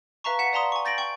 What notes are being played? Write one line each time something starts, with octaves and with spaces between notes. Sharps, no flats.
B4 E5 F5 A5 A#5 C#6
F#5 B6 E7
D5 F5 A5 A#5 C6 D#6
G#5 C#6
G6 A6 A#6 D7 F#7
G5 C#6